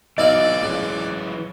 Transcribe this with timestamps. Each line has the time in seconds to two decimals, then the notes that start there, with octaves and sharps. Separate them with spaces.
0.18 B1 E3 F#3 E4 D5 D#5 F5
0.63 C#2 A2